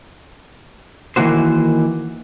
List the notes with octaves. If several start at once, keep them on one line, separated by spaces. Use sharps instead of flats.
D#3 E3 G#3 A#3 F#4 C5